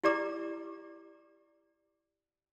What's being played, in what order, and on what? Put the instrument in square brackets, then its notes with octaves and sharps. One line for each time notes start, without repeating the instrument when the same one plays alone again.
[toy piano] E4 G4 D5 A#5 D6